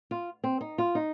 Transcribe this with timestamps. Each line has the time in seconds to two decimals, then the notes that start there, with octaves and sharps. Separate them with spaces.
0.11 F4
0.44 C4
0.61 D#4
0.78 F4
0.95 D#4